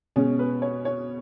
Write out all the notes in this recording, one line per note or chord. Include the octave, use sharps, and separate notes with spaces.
B2 G#3 C#4
B4
C#5
C#5